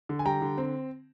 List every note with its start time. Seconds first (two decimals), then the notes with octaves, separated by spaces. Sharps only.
0.09 D3
0.19 G#5
0.25 G3 G5 A#5
0.42 D3
0.58 C4